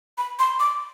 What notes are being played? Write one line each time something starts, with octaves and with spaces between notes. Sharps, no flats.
B5
C6
D6